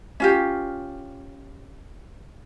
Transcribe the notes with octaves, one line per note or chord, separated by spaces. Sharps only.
C#4 F4 G4